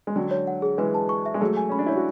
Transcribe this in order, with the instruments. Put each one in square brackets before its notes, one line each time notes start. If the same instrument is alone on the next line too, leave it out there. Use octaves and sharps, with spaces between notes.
[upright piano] G#3
[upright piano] D3 F#3 [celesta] D4
[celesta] C#5
F#5
G#4
[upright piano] E3 G#3 [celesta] B4
[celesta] A5
C#6
E5
[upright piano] G#3
[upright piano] F#3 A3 [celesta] G#4
[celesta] G#5
[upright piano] C#4 [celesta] B5
[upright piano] D4
[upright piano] E4 [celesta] C#5
[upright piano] F#4